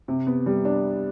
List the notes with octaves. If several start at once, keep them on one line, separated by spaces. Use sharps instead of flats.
C3
B3
G3
D4